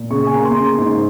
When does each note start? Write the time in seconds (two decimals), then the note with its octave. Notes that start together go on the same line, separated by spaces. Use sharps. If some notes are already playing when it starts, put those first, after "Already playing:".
Already playing: A#2
0.10 C#3 C#6
0.27 G#5
0.34 A#3 A#5
0.45 C6
0.56 C#3
0.78 G#2